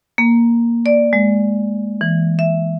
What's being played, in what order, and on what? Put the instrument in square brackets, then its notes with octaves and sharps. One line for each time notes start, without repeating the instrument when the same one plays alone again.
[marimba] A#3
D5
G#3
E3
E5